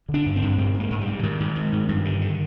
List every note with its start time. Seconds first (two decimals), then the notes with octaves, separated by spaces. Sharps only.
0.09 D3
0.14 D4
0.26 G2
0.36 C4
0.42 G2
0.58 G#2 C4
0.74 G#2
0.80 A#3
0.90 G#2
1.01 G3
1.07 G#2
1.19 D3
1.23 G#2 D#3
1.40 G#2
1.56 G#2
1.72 G#2
1.89 G2
2.05 D3
2.21 D3